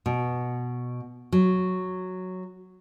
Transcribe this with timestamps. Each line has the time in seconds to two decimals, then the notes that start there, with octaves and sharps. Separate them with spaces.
0.06 B2
1.32 F#3